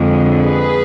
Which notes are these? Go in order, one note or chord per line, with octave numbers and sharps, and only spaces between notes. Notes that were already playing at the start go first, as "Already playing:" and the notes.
Already playing: F2 D3 G#3
G#4 B4